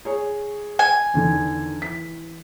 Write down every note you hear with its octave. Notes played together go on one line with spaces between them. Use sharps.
G#4 C#5
G#5
E2 D3 D#3
E3 B6